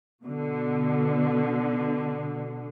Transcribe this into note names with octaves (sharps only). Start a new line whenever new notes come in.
B2 D3